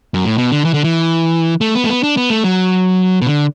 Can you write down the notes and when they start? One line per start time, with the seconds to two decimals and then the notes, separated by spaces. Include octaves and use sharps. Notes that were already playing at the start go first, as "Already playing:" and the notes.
0.14 F#2
0.25 A2
0.37 B2
0.52 D3
0.65 E3
0.74 D3
0.84 E3
1.61 A3
1.75 B3
1.85 A3
1.89 B3
2.03 D4
2.17 B3
2.30 A3
2.44 F#3
3.22 B2
3.27 D3